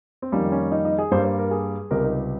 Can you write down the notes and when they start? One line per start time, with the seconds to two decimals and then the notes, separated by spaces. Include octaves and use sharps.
0.22 C4
0.32 F2 D#3 G3 A#3 C#4
0.52 C#4
0.72 D#4
0.85 D#4
0.98 G#4
1.11 G2 G3 A#3 C5
1.25 C5
1.38 A#4
1.51 G#4
1.91 C#2 C3 G3 C4 A#4
2.04 D#4